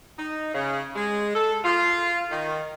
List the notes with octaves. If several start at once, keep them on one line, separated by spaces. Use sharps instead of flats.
D#4
C#3
G#3
A4
F4
D#3